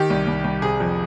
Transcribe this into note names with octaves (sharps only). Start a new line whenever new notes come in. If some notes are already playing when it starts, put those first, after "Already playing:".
Already playing: D#3 G4
C2
C2
C2
C3 G#4
F2